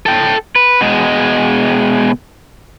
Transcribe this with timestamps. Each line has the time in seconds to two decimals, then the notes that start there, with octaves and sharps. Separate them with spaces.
0.06 A4 G5
0.56 B4
0.81 B2 G#3